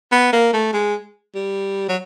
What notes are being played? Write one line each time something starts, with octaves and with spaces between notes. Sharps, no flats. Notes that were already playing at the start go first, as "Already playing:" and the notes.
B3
A#3
A3
G#3
G3
F#3